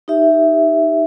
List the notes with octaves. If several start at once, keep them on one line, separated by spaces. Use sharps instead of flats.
D#4 G4 E5